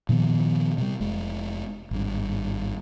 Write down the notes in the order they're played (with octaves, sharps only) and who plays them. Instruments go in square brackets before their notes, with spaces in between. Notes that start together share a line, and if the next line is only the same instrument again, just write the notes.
[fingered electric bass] A#2 D#3 F3 B3
C3 G3
F1 G#3
G#1 G2